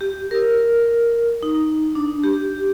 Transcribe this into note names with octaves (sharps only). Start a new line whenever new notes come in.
G4
A#4
D#4
D4
G4